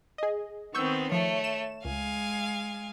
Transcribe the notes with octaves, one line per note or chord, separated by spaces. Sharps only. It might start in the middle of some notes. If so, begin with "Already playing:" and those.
G#4 D#5
D#3 B3 C4 C#6 E6 G6
F3 A3 C#5
E7
C#2 G#3 F5 G#5